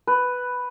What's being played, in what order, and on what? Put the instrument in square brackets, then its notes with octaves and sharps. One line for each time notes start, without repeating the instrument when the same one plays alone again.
[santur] B4